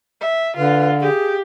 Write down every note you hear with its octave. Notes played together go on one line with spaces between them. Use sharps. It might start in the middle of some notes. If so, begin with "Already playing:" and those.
E5
D3 F4 B4
G4 G#4